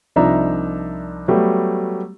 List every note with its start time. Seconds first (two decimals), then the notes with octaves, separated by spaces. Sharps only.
0.16 C2 F3 D4 D#4 E5 A#5
1.28 F#3 G3 A3 B3 G4